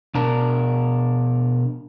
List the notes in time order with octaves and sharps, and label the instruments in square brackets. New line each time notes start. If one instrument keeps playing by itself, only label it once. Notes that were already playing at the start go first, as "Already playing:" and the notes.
[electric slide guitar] B2 D4 A#4